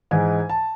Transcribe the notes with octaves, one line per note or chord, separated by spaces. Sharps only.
G#2 E3 G#3 D#4 G#5
A5